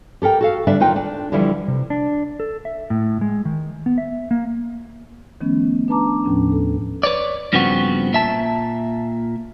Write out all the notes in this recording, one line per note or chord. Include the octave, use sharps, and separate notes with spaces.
G4 A4 A#4 G5
F#4 A4 F5
D3 G3 D4 B4 E5
D#3 D#4 F4 B4 G5
D4
D3 E3 F3 G3 E4
C3
D4
A4
E5
A2
G#3
D#3
B3
E5
A#3
D#3 F3 A3 B3 C#4
D4 B4 A5 A#5 D6
D#2 A2 F3 C#4 D4
A4
B4 C#5 D5
G2 C#3 F3 B3 C4 F#4
A#2 E5 A5